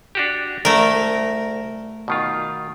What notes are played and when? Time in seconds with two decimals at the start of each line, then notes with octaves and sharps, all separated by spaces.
0.15 D4 F#4 G4
0.65 C2 A3 A#4
2.08 B2 D#3 F4